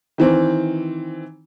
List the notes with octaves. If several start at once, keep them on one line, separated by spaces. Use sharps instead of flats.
D#3 E3 C4